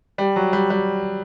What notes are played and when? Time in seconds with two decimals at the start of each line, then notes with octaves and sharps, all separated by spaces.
0.18 G3
0.36 F#3
0.53 G3
0.70 G3